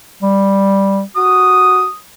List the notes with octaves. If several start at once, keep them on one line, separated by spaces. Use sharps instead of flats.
G3
F#4 D#6